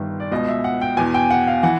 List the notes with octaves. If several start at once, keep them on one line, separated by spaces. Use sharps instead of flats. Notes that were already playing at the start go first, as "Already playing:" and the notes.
Already playing: G1 G2 D#3
D5
C#2 B2 D#5
E5
F#5
G5
E2 B2 G#5
G5
F#5
F5
E3 F#5